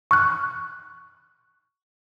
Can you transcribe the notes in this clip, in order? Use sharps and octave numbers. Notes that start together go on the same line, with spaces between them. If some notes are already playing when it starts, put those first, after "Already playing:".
C#6 F6 F#6